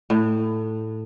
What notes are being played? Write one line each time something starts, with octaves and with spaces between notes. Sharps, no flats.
A2